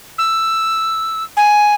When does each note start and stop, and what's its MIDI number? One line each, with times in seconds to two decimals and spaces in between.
0.18 1.24 88
1.37 1.75 80